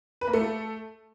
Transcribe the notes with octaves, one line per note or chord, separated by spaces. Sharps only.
B4
A#3
A3